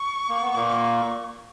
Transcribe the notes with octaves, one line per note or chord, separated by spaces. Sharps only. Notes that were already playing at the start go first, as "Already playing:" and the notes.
Already playing: C#6
A#3
B3
A#2 A#3